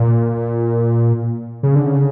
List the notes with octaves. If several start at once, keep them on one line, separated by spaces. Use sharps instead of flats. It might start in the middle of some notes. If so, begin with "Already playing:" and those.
Already playing: A#2
C#3
D3
C#3